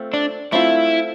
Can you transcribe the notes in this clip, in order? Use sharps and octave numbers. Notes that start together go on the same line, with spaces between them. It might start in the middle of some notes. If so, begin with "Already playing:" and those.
Already playing: A3 C4 F4
D4
A3 C4 E4 F4